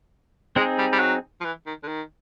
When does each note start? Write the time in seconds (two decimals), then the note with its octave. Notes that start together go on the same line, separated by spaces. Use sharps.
0.56 G#3 C4 D#4 G#4
0.78 G3
0.93 G3
1.00 F#3
1.41 F3
1.45 E3
1.66 D#3
1.83 D3
1.88 D#3